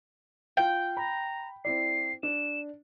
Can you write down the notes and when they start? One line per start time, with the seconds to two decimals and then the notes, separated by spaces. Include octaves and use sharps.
0.57 F4 F5 G5
0.97 A#5 B5
1.65 C4 E4 D5 C7
2.23 D4 E7